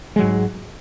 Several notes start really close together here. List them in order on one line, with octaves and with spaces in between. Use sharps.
G#3 F#3 G#2